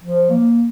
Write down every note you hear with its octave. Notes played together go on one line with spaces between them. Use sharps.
F3
A#3